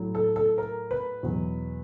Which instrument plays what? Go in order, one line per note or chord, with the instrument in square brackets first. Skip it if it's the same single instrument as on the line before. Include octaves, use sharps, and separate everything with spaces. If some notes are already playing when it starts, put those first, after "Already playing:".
Already playing: [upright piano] A2 F#3
A4
A4
A#4
B4
E2 B2 F#3